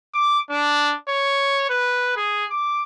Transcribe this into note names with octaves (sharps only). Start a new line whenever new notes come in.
D6
D4
C#5
B4
G#4
D6